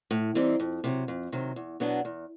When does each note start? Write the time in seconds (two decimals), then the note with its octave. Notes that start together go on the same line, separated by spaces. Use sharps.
0.11 A2
0.35 E3 G3 C4 D#4
0.60 F2
0.84 C3 D#3 F#3
1.08 F2
1.32 C3 D#3 F#3
1.56 E2
1.80 B2 F#3 B3 D4
2.05 E2